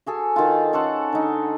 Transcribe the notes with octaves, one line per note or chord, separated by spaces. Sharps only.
F#4 G#4 A4
D#3 F4
C#4 A4 C5 F#5
D3 D#4